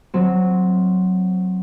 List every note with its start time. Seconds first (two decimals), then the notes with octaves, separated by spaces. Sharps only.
0.14 F#3 C4